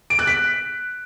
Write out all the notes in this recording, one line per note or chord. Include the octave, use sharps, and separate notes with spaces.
D7
F#6
B6